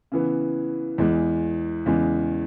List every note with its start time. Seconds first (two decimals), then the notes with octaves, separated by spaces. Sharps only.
0.12 C#3 E3 B3
0.98 E2 E3 G#3
1.86 E2 C#3 E3 G#3